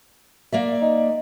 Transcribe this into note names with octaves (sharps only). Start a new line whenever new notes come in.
A#3 D5 E5
D#4